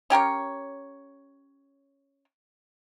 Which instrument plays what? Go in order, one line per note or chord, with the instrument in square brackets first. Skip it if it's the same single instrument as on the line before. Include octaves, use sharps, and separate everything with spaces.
[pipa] C#4 G4 A#4 C#5